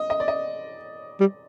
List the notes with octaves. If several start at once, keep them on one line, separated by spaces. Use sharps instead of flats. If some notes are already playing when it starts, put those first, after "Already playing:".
Already playing: D#5
D#5
D5
D#5
G3